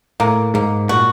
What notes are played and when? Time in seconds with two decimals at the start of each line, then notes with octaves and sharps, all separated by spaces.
0.20 A2 A#3
0.54 G#2 A#3
0.88 A#2 F#4